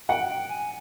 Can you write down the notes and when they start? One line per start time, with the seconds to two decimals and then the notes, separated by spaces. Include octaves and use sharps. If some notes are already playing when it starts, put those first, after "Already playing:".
0.08 F#5 G5
0.29 G5
0.49 G#5